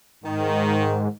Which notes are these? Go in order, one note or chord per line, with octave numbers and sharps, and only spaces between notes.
G#2 D#3